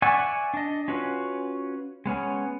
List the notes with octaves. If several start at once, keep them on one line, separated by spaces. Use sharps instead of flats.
D5 E5 F#5 G#5 C#6
D4 D#5
C#4 F4 F#4 B4
G#3 B3 C#4